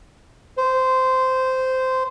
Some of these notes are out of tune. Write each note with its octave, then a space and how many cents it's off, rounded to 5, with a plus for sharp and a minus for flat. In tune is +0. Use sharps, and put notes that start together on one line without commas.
C5 -15